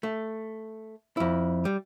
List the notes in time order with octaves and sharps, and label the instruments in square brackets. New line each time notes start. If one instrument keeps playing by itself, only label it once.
[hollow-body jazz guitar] A3
F2 E4
G3